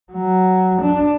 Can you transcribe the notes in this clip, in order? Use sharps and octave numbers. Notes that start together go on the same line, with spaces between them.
F#3
D4